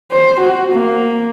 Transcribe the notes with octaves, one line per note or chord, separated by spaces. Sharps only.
C5
F#4
A#3